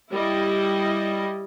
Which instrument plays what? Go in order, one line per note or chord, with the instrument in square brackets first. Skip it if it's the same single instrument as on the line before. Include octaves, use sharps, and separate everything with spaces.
[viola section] G3 E4 D#5